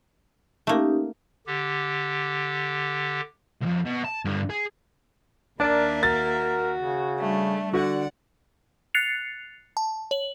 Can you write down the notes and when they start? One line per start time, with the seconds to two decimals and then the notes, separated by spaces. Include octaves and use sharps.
0.67 A3 A#3 C#4 D#4 G4
1.47 D3 G4
3.62 C2 F2
3.85 B2
4.05 A5
4.25 G2 D3
4.50 G#4
5.60 D#2 A#3 D4 A#4 D5 E5
6.03 F#4 A#4 A6
6.78 C#3
7.18 G3 A3 D4
7.73 D3 F#4 D5 F#5
8.94 F#6 A6 C7 C#7 F7
9.77 A5
10.11 C#5 F#7